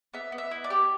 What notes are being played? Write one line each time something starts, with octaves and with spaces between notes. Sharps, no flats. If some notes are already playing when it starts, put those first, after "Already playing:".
B3 E5
B3
E5
E4
D5
G4